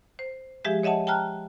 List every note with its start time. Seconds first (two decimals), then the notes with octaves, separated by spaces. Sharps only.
0.19 C5
0.65 F3 G#3 G4 G#4 E5
0.83 C#5 D#5 E5 F#5 A5
1.07 G5 A5 A#5 F6 F#6